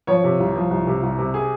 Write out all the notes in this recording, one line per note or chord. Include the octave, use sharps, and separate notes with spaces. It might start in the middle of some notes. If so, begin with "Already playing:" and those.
F3 C#5
C3
C2
F3
C2
C3
C2
C3
G#4